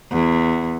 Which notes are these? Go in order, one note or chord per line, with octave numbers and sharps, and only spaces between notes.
E2